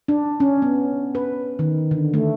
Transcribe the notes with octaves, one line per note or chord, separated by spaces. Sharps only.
D4
C#4
B3
B4
D#3
D3
A3